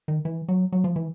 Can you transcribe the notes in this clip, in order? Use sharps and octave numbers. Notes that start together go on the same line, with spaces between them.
D#3
E3
F#3
F#3
F3
E3